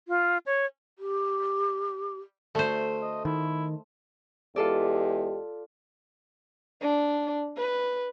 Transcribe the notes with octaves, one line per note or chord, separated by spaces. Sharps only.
F4
C#5
G4
D2 A3 C5
D#5
D#3 E4
E2 G#3 F4 G4 A4 D5
D4
B4